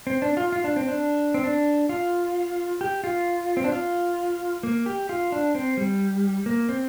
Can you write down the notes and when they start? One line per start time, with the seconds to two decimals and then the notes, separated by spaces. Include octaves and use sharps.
0.07 C4
0.22 D4
0.37 F4
0.52 F4
0.64 D4
0.76 C4
0.88 D4
1.34 C4
1.44 D4
1.89 F4
2.81 G4
3.04 F4
3.57 C4
3.64 D4
3.72 F4
4.63 A#3
4.86 G4
5.09 F4
5.32 D4
5.55 C4
5.77 G3
6.46 A#3
6.69 C4